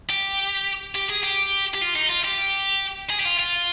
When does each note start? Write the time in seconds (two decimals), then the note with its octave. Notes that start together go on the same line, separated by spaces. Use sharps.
0.10 G4
0.96 G4
1.10 G#4
1.24 G4
1.74 G4
1.81 F4
1.96 D#4
2.10 F4
2.24 G4
3.10 G#4
3.20 G4
3.25 F4
3.39 F4